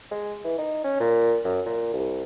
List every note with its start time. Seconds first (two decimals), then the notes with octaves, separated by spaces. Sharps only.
0.11 G#3
0.45 E3
0.58 D#4
0.84 C#4
1.00 A#2
1.45 F#2
1.66 A#2
1.93 C2